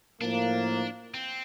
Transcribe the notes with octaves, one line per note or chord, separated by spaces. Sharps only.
A2 F3 A#3 D4
C4